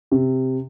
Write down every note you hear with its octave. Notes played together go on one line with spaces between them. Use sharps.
C3